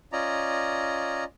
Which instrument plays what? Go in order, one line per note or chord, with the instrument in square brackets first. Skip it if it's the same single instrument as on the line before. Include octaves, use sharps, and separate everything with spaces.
[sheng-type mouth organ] C#4 F4 D5 D#5 A#5